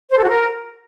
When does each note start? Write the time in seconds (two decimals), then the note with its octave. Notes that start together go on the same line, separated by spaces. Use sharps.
0.11 C5
0.17 A4
0.23 F#4
0.29 A#4